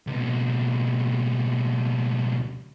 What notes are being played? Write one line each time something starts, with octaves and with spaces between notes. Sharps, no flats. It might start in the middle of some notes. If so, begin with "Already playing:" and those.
C#2 B2